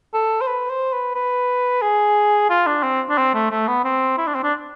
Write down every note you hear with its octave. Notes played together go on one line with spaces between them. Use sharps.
A4
C5
B4
C5
B4
B4
G#4
F4
D4
C4
D4
C4
A3
A3
B3
C4
E4
D4
C4
D4